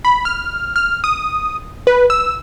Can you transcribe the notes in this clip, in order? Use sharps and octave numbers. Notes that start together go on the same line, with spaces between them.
B5
F6
F6
D#6
B4
E6